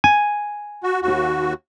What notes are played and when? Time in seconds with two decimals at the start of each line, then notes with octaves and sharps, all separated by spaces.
0.04 G#5
0.83 F#4
1.02 D#2 F#4